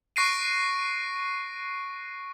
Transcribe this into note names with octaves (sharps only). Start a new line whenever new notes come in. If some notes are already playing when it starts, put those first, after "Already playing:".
C#6 F#6 A#6 C7 D7 D#7